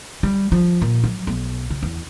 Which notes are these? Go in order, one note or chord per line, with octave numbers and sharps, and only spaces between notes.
G3
F3
A#2
F#3
B1
C#3
E2